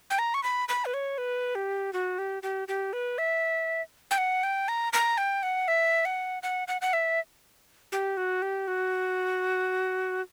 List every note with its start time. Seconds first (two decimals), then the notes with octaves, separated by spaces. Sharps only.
0.10 G5
0.19 A#5
0.34 C#6
0.43 B5
0.69 B5
0.85 B4
0.94 C#5
1.18 B4
1.55 G4
1.93 F#4
2.18 G4
2.43 G4
2.68 G4
2.93 B4
3.18 E5
4.11 G5
4.18 F#5
4.43 G5
4.68 A#5
4.93 A#5
5.18 G5
5.43 F#5
5.68 E5
6.05 F#5
6.43 F#5
6.68 F#5
6.82 F#5
6.93 E5
7.92 G4
8.17 F#4
8.42 G4
8.68 F#4